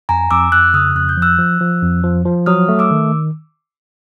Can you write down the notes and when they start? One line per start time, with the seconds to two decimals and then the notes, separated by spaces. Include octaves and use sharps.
0.09 F2 G#5 A#5
0.30 F2 D6 E6
0.52 F2 E6 F#6
0.74 C#3 D#6 F6
0.95 F2 F#6
1.09 G6
1.17 F3
1.22 E6 F#6
1.39 F3
1.61 F3
1.82 F2
2.04 F3
2.25 F3
2.46 F#3 D#6 F6
2.69 A3
2.79 D6 E6
2.91 D#3